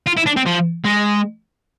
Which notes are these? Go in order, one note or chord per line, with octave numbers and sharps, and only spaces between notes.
F4
E4
D4
C4
F3
G#3